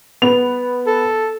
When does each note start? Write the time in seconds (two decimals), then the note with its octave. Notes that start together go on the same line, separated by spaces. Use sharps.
0.22 B3 F7
0.86 A4